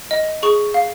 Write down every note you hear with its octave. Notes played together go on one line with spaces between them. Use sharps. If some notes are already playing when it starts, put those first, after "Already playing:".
D#5
G#4 C#6
F5